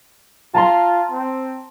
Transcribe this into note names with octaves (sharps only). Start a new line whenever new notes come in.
F4 A5 A#5 C6
C4